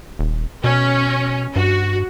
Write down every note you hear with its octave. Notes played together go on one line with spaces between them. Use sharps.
D#1
B2 C#4
G2 F#4